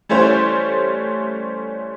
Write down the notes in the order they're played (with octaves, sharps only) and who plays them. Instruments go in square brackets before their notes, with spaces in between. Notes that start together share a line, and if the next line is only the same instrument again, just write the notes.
[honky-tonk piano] E3 G3 A3 C#4 C5